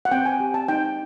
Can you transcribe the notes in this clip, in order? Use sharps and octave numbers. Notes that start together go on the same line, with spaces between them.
F#5
C4 G5
G#5
G4
A5
D#4 G5